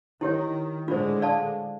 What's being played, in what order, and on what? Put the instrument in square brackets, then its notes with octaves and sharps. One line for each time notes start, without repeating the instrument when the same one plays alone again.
[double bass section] D#3 [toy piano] E4 G4 C#5
[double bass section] A2 D3 G#3 [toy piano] F4 C5
[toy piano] D5 F5 A5